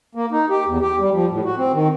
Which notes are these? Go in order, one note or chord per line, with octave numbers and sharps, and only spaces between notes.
A#3
D#4
G4
E2
G4
G3
F3
A2
F#4
C4
D#3